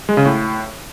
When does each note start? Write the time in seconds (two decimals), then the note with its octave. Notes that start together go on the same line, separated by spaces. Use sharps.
0.09 G#3
0.17 C#3
0.25 A2